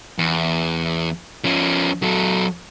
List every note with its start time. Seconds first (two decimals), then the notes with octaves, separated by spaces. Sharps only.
0.19 E2
1.44 F3 C#4
2.02 F#3 A4